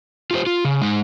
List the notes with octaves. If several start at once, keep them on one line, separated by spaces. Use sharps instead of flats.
F4 G4 C5
F4
C#3
G#3 D#4